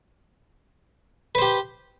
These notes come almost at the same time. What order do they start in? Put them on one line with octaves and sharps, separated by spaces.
B4 C5 G4